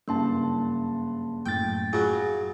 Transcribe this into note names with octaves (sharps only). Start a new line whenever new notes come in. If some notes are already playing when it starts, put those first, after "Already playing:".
F#1 G2 A#3 A5 C6
F#2 A2 G5 A6
C#3 F#3 F4 G#5